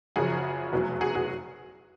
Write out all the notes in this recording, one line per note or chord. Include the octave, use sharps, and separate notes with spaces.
F#1 F#2 C#3 F3 F#4 G#4
F1 E2 B2 F#3
F#4 G#4
F#4 G#4